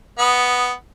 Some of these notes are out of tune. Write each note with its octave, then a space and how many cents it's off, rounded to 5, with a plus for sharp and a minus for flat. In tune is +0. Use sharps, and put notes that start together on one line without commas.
B3 +0 D#5 +0